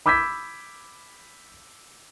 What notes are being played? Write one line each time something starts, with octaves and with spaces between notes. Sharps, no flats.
B5 D6 E6 G6 G#6 B6